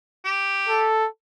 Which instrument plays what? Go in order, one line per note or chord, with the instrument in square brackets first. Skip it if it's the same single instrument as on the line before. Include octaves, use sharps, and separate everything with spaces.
[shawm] G4
[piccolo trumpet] A4